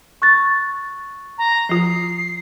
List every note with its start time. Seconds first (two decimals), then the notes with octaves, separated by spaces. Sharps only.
0.22 C#6 F#6 A6
1.38 A#5
1.69 F3 F4 C7